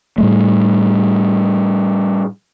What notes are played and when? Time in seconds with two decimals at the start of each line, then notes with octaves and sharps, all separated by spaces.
0.18 A2 G3 A3